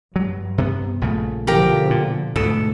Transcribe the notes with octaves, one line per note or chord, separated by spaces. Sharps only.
G2 F#3
C3 A#3 B3
A#1 C#3 A3
B2 D3 F3 G4 A#4 G5
A#2
D2 G#2 B2 A4